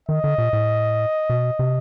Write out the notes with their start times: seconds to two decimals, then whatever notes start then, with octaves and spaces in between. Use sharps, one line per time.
0.09 D#3 D#5
0.24 D3
0.38 A#2
0.53 A2
1.30 B2
1.59 C3